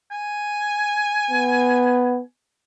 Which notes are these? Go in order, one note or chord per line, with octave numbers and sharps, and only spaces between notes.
G#5
B3